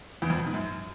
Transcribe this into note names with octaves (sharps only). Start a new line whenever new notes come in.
E2
F2
B2
G#2
F#2